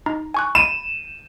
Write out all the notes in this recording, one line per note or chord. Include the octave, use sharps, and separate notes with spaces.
D#4 A#5
G#5 C#6 F#6
B5 D#7 E7